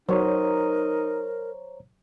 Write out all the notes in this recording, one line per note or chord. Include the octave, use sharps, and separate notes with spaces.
F#3 D#4 A#4 C5 C#5 A#5